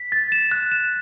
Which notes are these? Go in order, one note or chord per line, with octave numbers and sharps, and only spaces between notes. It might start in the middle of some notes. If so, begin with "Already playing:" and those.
Already playing: B6
A6
E7
F#6
E7